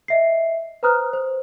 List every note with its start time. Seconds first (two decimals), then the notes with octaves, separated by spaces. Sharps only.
0.08 D#5 E5 C7
0.83 B4 C5 A#5 D#6 F6 F#6
1.13 C5